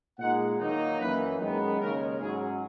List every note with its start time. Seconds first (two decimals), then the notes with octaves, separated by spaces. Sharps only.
0.19 A#2 G#3 D#4 F#5
0.59 D#2 D#3 F#3 A#3 D#4
1.00 F#2 E3 A#3 B4
1.40 F#2 D#3 G#3 B3
1.80 D#2 C#3 G#3 A#4
2.19 G#2 F#3 C#4 G#4